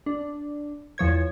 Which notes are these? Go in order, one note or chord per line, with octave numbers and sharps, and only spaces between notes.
D4
E2 F3 C#5 G#6